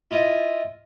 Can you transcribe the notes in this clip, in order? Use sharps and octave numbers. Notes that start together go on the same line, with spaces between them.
E4 F4 D#5